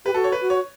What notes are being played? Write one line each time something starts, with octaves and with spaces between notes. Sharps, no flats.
G4 B4
F#4 A4
C#5
B4
F#4
C#5